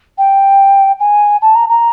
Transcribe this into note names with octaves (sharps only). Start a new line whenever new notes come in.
G5
G#5
A5
A#5
A#5